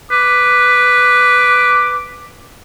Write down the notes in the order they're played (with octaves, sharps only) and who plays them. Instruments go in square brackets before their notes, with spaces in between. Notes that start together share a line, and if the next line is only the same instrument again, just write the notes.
[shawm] B4 [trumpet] D6